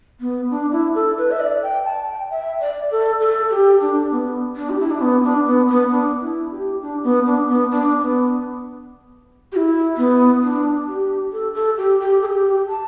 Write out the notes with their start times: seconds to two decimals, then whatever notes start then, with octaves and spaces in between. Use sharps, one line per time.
0.20 B3
0.51 D4
0.72 E4
0.95 A4
1.18 B4
1.31 E5
1.40 D5
1.63 G5
1.85 A5
2.07 G5
2.30 E5
2.60 D5
2.91 A4
3.21 A4
3.51 G4
3.81 D4
4.11 B3
4.56 D4
4.70 G4
4.80 E4
4.91 D4
5.01 B3
5.24 D4
5.46 B3
5.68 B3
5.91 D4
6.21 E4
6.51 G4
6.82 D4
7.04 B3
7.26 D4
7.49 B3
7.72 D4
8.01 B3
9.52 G4
9.56 E4
9.97 B3
10.42 D4
10.88 G4
11.32 A4
11.54 A4
11.77 G4
12.00 G4
12.22 A4
12.26 G4
12.68 A5